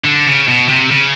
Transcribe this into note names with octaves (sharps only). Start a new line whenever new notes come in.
D3
C#3
B2
C3
C#3